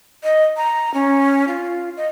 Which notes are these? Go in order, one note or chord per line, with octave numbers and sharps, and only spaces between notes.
D#5
A#5
C#4
F4
D#5